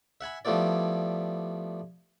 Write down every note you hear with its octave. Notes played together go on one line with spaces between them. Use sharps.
E5 F#5 G#5 B5
F3 G3 A3 B3 E4 D5